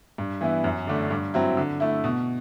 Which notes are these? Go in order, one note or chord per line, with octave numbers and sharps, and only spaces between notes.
G2
E3 B3 E4
F#2
D3 A3 D4
G2
F#3 C4 E4
D3
A3 E4
B2